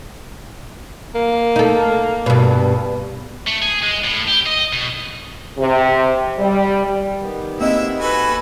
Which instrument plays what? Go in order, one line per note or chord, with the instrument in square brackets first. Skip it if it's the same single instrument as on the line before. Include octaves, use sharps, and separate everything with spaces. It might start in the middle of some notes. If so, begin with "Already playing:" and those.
[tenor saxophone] A#3
[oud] D#4 A4
G2 B2
[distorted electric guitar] A3
G#4
G#3
A2
G4
D#5
B2
[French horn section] C3
G3
[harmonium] D#3 B3 G4
[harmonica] G#3 E4 E6 [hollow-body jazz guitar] A#3 C4 D#5
[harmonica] F#4 A4 G#5 [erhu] B4